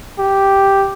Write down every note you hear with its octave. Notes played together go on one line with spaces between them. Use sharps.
G4